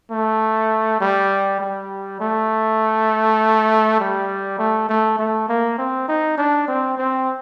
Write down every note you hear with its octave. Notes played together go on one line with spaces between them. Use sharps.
A3
G3
G3
A3
G3
A3
A3
A3
A#3
C4
D#4
D4
C4
C4